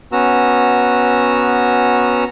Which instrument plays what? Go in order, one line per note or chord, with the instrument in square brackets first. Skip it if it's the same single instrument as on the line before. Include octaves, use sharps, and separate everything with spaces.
[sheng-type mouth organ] B3 C#4 F#4 A#5 E6